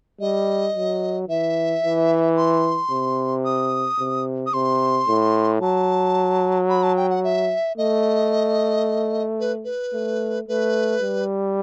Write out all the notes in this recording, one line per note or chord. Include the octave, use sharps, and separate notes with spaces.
G3 D#5
F#3
E3 E5
E3
C6
C3
D#6
C3
D#6
C3 C6
A2
F#3 A5
B5
A5
G5
F#5
E5
A3 D#5
B4
B4
A3
A3 B4
G3